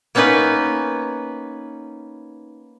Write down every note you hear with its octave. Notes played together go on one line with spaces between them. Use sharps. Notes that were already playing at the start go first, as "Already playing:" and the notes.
A#3 B3 C#4 D#4 B4